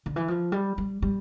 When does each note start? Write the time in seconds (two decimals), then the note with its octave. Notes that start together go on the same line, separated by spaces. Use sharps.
0.06 D3
0.16 E3
0.28 F3
0.52 G3
0.78 G3
1.02 G3